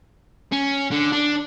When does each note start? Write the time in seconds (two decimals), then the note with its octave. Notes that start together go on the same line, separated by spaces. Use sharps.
0.52 C#4
0.91 D3
1.12 D4